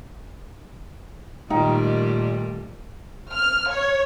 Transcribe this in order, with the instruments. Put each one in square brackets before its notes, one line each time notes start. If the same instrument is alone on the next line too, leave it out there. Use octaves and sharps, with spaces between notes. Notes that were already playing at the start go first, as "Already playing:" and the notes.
[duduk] A#2 [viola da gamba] D#3 G3 A3 [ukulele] D#4 G5
[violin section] F6
C#5